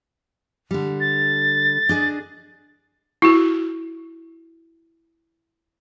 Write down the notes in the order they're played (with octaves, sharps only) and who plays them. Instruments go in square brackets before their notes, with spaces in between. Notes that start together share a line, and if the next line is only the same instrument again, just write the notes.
[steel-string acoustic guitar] D3 G3
[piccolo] A6
[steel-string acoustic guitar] D4 G#4 D#5
[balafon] E4 F#4